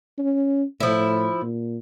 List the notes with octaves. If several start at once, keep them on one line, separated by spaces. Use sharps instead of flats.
C#4
A2 F3 E4
A#2